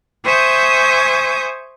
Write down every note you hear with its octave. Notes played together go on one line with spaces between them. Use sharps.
C5 E5 G#5 C#6 D#6 G6